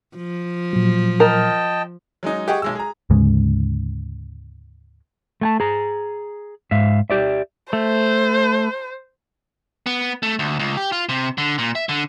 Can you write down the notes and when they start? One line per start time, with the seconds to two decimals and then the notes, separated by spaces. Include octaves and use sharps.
0.16 F3
0.73 A#2 F#3
1.20 A#4 D#5 G5 A5
2.23 F#3 G#3 C#4 D#4
2.48 G4 G#4 D#5 F#5 G#5 C#6
2.62 B1 G#3 E6
2.75 G#4 A#5
3.10 D2 G#2 C#3 G#3
5.41 A3 G#5 A5
5.60 G#4 A#5
6.71 G#2 E5 F5
7.10 G4 D5 E5
7.73 A3 C5
9.86 B3
10.23 A3
10.39 D2
10.59 C#2
10.77 G4
10.92 F4
11.09 C3
11.38 D3
11.58 A#2
11.75 E5
11.89 D3